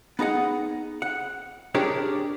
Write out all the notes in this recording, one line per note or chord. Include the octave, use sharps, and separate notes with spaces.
B3 D#4 G#4 F#5
F#5
D4 G4 G#4 A#4 C#5 D5